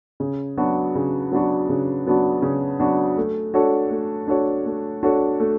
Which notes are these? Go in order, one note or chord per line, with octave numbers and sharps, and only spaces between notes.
C#3
F#3 B3 D4 F#4
C#3
F#3 B3 D4 F#4
C#3
F#3 B3 D4 F#4
C#3
F#3 B3 D4 F#4
A3
D4 F#4 A4 C#5
A3
D4 F#4 A4 C#5
A3
D4 F#4 A4 C#5
A3